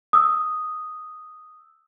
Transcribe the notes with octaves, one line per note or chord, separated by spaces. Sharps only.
D#6 E6